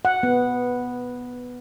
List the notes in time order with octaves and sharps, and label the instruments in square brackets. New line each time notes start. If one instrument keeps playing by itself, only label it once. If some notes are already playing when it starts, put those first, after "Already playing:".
[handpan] F#5
B3